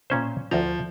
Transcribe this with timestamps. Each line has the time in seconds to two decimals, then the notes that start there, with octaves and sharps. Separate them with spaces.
0.10 A#2 C#4 C5
0.51 D2 F3 A#5